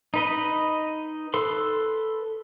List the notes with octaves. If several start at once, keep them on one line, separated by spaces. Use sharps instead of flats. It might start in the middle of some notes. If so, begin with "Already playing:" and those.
D#4 B4 D#5
A4 B4 C6